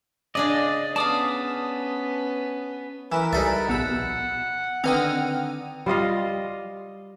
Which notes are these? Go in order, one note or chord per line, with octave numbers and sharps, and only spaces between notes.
C#3 D4 G#4 D5 D#5
B3 C#4 D5 F5 A5 D#6
E3 A#4 B4 E7
C#2 G3 D#4 A4 E5 A6
A#1 B2 F#5 E6
D3 D#3 C4 B4 G5 D#6 F6
G3 F4 D#5 F5